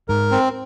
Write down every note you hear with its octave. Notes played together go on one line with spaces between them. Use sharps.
G#2 A#4
C4